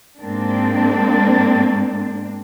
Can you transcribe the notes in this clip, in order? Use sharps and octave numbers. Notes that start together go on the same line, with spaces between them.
G#2 G#3 A#3 C4 D4